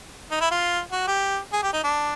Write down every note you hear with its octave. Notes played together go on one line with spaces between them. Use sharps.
D#4
E4
F4
F#4
G4
G#4
G4
D#4
D4